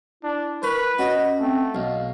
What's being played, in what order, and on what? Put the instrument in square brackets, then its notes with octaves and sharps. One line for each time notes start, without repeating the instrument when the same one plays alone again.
[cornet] D4 [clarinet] E4
[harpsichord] A#4 [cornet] B4 [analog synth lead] C#6
[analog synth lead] C#4 [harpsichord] F#4 [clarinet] D#5
[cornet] A3 [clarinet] C4
[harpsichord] B1 [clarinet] D#5 [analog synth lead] F5